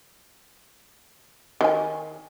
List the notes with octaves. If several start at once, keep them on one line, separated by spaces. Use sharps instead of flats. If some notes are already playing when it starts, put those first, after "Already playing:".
D#3 G#5